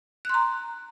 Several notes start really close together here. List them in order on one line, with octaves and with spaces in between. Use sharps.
F#6 C6 A#5